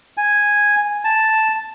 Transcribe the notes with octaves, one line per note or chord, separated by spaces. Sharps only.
G#5
A5